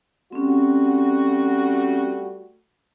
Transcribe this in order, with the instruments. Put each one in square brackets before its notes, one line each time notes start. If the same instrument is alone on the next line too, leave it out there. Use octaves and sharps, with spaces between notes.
[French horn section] G3 A3 F#4 [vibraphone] C4 C#4